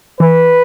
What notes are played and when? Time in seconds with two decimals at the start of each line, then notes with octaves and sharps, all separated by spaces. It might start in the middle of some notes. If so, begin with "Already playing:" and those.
0.20 E3 B4